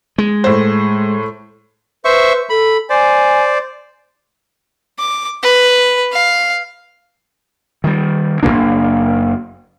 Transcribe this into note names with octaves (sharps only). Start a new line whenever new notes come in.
G#3
A2 C5
B4 C5 E5 C#6
A4 B5
C5 D5 G#5
D6
B4
F5
D#3 G3
F#1 A2 A#3 D4